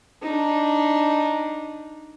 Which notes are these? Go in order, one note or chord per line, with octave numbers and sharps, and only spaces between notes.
D4 D#4